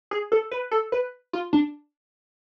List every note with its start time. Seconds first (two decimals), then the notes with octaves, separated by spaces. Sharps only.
0.11 G#4
0.32 A4
0.51 B4
0.71 A4
0.92 B4
1.33 F4
1.53 D4